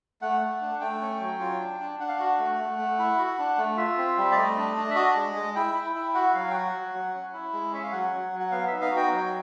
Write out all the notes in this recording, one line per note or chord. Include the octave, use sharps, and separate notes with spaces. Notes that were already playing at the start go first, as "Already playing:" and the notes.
A3 F#5
A3
D4
A3 G5
C#4
F#3
F4
D4
D4
D4 F#5
F5
F#4 F#5
A3
A3
A3
E4
F#4
D4
A3
F4 E5
C4
G3
D5
A3 D#5
D4
D4
E5
F#4 D#5
G#3
G#3
E4 G5
E4
E4
F#4 F#5
F#3 F5
G5
F#4 F#5
F#3
F#3
C#4
E4
G#3
C#4 E5
F5
F#3 F#5
F#3
F#3
F#5
B3 F5
D#4 E5
F5
F#4
G5
F#3